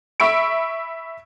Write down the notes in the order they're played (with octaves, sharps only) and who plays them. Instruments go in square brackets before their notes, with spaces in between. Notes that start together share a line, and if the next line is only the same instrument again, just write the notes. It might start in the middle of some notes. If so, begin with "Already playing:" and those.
[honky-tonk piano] E5 B5 C#6 D7